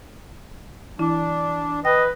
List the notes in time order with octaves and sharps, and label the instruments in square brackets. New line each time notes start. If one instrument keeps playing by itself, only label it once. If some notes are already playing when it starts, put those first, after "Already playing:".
[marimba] E3 E4 [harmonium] D4
[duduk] B4 [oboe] D#5 [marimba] G5